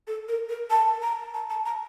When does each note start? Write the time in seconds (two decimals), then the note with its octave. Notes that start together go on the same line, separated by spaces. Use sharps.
0.07 A4
0.28 A#4
0.49 A#4
0.71 A5
1.02 A#5
1.34 A5
1.50 A5
1.66 A#5